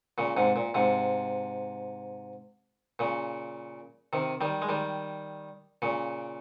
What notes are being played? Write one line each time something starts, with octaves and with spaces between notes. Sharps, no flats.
A#2 C#3
G#2 C3
A#2
G#2 C3
A#2 C#3
C3 D#3
D#3 G3
G#3
D#3 G3
A#2 C#3